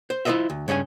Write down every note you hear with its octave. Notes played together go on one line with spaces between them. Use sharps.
C5
E4 F4 A#4 C5 D#5 E5
D2
G2 C#3 C#4 C5 G#5